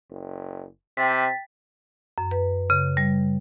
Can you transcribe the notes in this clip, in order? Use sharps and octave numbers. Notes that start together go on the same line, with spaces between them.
F#1
C3 G5 A6 B6
F#2
B4
C#3
G3